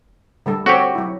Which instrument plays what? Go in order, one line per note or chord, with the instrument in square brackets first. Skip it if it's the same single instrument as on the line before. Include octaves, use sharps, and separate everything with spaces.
[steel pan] D3 G3 A4
[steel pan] C4 A4 C#5 [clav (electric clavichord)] F#4 G4
[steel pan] F#3 E4